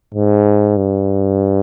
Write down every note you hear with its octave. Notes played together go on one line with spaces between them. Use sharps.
G#2
G2